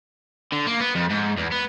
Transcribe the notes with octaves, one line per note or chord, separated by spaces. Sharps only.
D3
A#3
B3
F2
G#2
E2
B3